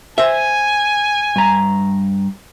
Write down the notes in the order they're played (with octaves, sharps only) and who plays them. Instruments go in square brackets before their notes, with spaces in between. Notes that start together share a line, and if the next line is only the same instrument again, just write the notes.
[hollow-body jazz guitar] C5 E5 [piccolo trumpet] G#5
[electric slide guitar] G2 A#5